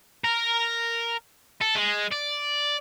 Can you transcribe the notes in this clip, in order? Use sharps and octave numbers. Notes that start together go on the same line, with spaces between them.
A#4
A4
G#3
D5